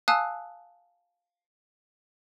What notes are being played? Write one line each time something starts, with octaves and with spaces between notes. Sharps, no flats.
F5 G#5 A5 D#6 E6 F#6